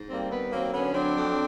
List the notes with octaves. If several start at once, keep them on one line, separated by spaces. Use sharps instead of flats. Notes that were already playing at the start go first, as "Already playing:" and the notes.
Already playing: G#2
G3 A#3 C4
D#3 B3
F#3 A#3 C4
D3 B3 C#4
F#3 C4 D4
F2